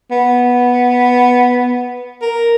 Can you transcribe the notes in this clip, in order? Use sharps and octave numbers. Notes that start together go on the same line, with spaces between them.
B3
A#4